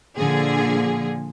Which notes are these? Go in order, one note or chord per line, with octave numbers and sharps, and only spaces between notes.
A#2 D3 F3 G#4